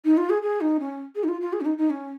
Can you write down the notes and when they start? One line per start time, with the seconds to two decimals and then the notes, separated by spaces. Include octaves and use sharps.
0.05 D#4
0.17 F4
0.30 G#4
0.42 G#4
0.61 D#4
0.80 C#4
1.16 G#4
1.24 D#4
1.28 F4
1.41 F4
1.53 G#4
1.61 C#4
1.65 D#4
1.78 D#4
1.90 C#4